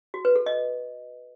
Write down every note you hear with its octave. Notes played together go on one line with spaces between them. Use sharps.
F#4
B4
A4
D#5